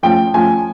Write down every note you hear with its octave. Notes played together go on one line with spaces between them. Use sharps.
F3 A3 C#4 G5
F3 A3 C#4 G#5